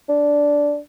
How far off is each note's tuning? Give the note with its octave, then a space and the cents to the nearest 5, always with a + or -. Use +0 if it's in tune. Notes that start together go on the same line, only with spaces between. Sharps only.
D4 -10